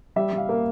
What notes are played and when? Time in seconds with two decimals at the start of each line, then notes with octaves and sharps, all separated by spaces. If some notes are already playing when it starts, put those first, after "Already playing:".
0.16 G3 E5
0.33 G3 F5
0.49 A#3